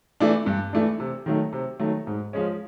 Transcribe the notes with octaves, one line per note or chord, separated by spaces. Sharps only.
E3 A3 D4
G2
E3 A3 D4
C3
D#3 F#3 A3
C3
D#3 F#3 A3
G#2
F3 G#3 C#4